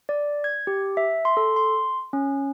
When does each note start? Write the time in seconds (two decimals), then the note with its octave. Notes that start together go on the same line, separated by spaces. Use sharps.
0.09 D5
0.44 G#6
0.67 G4
0.97 E5
1.25 C6
1.37 A4
1.56 C6
2.13 C#4